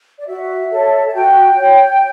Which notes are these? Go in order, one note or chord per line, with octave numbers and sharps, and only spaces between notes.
D5
F#4 E5
A4 C#5
A5
F#4 G5
C#5